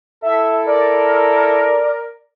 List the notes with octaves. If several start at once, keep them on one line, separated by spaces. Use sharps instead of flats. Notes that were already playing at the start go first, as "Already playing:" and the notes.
E4 A4 E5
A#4 D5